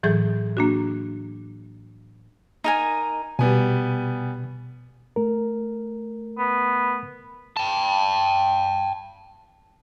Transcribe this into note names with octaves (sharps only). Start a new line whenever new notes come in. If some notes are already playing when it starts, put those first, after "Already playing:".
A2 E3 F#3 G#4 G6
A#3 D4 F#4
D#4 A#4 G#5
B2 G3 B3 G#5
A3 A#4
B3
G5 A5